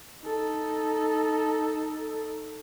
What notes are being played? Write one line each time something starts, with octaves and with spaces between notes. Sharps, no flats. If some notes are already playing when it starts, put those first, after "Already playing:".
D#4 A4